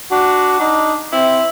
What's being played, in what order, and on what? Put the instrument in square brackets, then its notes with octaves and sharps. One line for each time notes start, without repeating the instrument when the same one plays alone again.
[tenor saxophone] D4 [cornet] F#4
[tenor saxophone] D4 [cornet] D#4
[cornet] C4 [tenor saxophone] E4